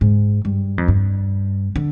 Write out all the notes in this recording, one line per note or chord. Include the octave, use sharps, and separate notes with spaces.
G#2
G2
F2
G2
D3